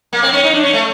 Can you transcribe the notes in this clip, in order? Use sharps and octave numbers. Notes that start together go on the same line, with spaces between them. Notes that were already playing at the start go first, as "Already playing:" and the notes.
A#3
C4
C#4
D#4
D4
C#4
A3